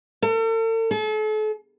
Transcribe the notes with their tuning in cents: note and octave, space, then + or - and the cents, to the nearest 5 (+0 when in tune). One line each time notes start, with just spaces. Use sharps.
A4 +40
A4 -40